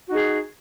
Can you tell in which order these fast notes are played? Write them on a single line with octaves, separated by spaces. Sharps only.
F#4 D#4 G#4